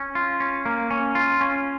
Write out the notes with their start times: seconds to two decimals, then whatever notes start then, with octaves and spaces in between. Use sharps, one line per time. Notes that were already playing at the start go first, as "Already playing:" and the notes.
Already playing: C#4
0.15 F4
0.40 C#4
0.66 A#3
0.90 C#4
1.15 F4
1.41 C#4